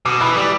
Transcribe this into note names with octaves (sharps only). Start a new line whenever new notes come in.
B2 D6
E3 B5
G3 D6